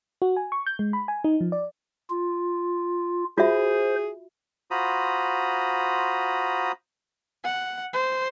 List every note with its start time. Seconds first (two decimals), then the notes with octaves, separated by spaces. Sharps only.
0.22 F#4
0.37 G#5
0.52 C#6
0.66 G6
0.79 G#3
0.93 B5
1.08 G#5
1.24 D#4
1.41 F3
1.52 D5
2.10 F4
3.38 F4 F#4 G#4 C5 E5
4.71 F4 F#4 C5 A#5 B5 D#6
7.44 F#5
7.93 C5